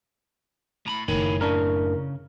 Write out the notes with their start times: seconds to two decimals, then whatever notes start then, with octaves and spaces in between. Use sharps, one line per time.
0.86 A2 A#5 B5
1.08 F#1 A2 D#3 C#5 G#5 B5
1.41 C#3 C#4 D4 A#4